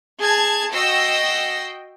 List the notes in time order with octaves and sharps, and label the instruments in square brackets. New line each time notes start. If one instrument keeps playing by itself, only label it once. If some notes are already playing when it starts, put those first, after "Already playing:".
[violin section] G#4 A5 G#6
F#4 D#5 G5 E6 A#6 C7